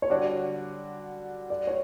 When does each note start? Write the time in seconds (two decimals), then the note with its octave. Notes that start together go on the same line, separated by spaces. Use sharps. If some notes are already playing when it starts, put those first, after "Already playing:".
0.02 C#5
0.09 D3 G3 D4 F#4 D5
1.50 D5
1.67 C#5